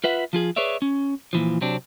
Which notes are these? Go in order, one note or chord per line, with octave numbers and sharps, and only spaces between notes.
F4 B4 E5 F#5
F3 F4 G#4
G#4 B4 C#5 D5 E5
C#4
A#2 E3 F3
C3 F#3 C4 D4